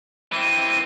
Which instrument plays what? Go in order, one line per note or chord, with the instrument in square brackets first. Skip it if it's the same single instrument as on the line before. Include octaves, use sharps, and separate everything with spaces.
[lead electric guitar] E3 C4 [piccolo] D#7